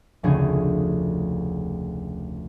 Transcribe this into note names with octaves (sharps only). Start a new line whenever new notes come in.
F1 D2 C#3 G#4 G#6